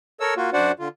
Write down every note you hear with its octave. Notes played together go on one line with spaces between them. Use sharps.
A4 A#4 C#5 E6
A#3 F4 F#4
F#2 D4 F#4 C5 D5 F#5
D3 F4